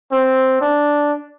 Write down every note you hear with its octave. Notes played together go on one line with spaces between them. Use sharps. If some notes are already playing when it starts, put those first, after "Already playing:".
C4
D4